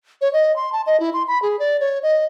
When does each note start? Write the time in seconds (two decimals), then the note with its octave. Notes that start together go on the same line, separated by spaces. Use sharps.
0.21 C#5
0.33 D#5
0.56 C6
0.72 A5
0.86 D#5
1.00 E4
1.14 C6
1.28 B5
1.42 G#4
1.59 D5
1.80 C#5
2.03 D#5